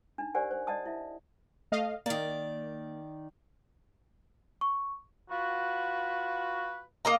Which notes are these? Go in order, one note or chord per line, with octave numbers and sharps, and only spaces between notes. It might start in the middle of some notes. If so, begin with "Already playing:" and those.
D4 D#4
G4 A#4 C5 D5 F#5 G#5
C5
D5 D#5 F#5 A5 D#6
E4 E5
A3 D#5 F5
D#3 A#3 D5
C#6
F4 F#4 B4
A#3 D#5 A#5